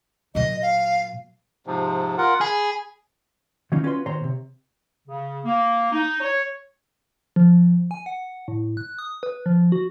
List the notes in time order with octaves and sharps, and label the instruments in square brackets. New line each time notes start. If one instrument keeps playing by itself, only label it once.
[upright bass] A#2 F#3 [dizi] D#5
[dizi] F5
[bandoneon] G#2 C3 F3
F4 A#4 F#5
[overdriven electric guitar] G#4 [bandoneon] B5
[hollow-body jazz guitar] D#3 F#3 A#3 C#4 D#4 F4
C#4 F4 F#4 B4 A#5 C6
A#2 D#3 C5 C#5 A#5 C6
C3
[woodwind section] C#3
A#3
D#4
C#5
[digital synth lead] F3
G#5
F#5
A2
F#6
D#6
B4
F3
F#4